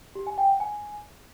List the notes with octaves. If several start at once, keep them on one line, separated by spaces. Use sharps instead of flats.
G4
G#5
G5
F#5
G#5